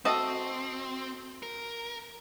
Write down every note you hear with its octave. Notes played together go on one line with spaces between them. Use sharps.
C4 F#4 A4 D#5
A#4